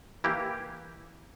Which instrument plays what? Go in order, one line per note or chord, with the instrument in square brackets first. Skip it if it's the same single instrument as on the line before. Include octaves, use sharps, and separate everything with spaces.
[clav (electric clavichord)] E3 A#3 E4 G4